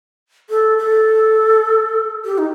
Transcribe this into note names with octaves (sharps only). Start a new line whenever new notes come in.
A4
A4
G4
D#4